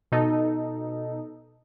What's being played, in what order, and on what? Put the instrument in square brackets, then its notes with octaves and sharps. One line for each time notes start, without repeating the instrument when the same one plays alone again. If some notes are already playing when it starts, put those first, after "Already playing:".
[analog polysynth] B2 D#4 A4